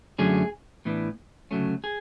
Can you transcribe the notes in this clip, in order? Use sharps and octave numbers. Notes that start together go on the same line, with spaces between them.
F#2 D3 F#3 A3 C#4 G#4
A2 E3 B3 D4
D2 C#3 F#3 A3 C#4
G#4